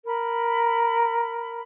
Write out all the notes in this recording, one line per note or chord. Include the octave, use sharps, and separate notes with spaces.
A#4 B5